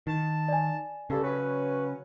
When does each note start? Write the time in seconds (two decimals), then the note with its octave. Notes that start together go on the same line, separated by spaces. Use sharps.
0.07 D#3 A5
0.48 D5 G#5
1.10 G2 C#3 A4
1.23 F#3 C#4 B4